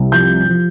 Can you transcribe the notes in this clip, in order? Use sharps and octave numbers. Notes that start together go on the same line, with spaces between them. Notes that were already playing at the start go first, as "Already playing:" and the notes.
Already playing: C2
F3 G6
F3